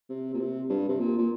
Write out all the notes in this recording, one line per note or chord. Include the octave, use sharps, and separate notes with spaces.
C3
A#2
C3
G2
C3
A#2
A#2